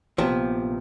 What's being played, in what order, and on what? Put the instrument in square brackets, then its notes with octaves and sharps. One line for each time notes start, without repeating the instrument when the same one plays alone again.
[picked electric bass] A#1 A#3 B3 [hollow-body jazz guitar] C3 F3